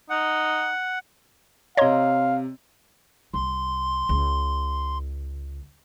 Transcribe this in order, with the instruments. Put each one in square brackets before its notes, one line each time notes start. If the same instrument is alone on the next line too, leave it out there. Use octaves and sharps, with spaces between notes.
[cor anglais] D#4 [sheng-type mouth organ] F#5
[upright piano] C3 A#5 [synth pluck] C#5 D#5 C6 [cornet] F5
[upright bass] C2 [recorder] C6
[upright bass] C#2